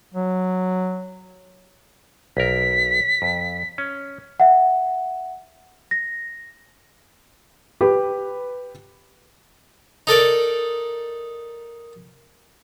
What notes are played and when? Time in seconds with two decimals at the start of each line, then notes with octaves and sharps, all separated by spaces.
0.14 F#3
2.37 B1 A#4 B6
3.22 F2
3.78 C#4
4.40 E5 F#5
5.91 A#6
7.81 G4 B4
10.07 D#4 A4 A#4 D5